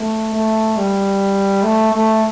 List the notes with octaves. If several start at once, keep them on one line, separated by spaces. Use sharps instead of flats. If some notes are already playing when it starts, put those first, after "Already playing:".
Already playing: A3
A3
G3
A3
A3